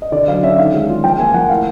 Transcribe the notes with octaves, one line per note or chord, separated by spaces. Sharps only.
D#5
D3 D5
F#3 F5
C#4 E5
D#3 F5
G#3
F4
F3 G5
A#3 G#5
F3 F#5
A2 F5